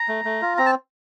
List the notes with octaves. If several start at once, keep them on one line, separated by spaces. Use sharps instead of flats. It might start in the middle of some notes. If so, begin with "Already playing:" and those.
Already playing: A#5
A3
A3
F4
C4 A#5
A5